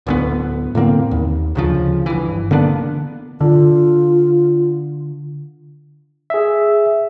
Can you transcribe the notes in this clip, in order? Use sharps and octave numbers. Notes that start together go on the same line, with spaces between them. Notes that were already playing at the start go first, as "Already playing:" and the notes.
D1 D2 B3
A2 D3 A#3 C4
D#2
D2 C#3 F3
G1 E3
D3 A#3 B3 D4
D3 F4
G#4 E5